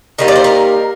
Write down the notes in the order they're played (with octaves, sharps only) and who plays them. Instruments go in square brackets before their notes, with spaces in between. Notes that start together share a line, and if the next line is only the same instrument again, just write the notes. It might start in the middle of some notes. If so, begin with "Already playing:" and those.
[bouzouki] D#3 G3 A#3 D#4 D#5
D5
C5
A#4